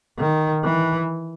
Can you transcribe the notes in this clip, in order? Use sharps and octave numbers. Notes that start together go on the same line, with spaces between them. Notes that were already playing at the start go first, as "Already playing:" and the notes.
D#3
E3